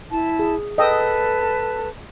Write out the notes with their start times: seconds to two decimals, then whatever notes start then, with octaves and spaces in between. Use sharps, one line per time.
0.11 E4 A5
0.39 G#4
0.78 A4 B4 D#5 G5 A5 E6